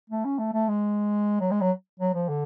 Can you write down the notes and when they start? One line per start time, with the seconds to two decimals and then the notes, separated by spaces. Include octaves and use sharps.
0.10 A3
0.25 C#4
0.38 A3
0.53 A3
0.69 G#3
1.41 F#3
1.51 G#3
1.61 F#3
2.00 F#3
2.14 F3
2.29 D3